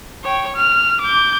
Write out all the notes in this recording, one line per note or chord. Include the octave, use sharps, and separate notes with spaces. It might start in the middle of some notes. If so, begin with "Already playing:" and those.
C#5 G5
F6
D6 G6